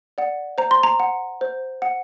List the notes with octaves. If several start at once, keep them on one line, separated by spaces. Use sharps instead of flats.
D5 F#5
C5 A#5
C6
A#5
F#5
C5
F#5